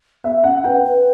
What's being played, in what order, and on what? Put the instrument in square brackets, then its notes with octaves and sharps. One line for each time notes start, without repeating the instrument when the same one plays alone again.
[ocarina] B3 [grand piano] E5
[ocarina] C#4 [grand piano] F#5
[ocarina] B4 [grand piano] G5
[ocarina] B4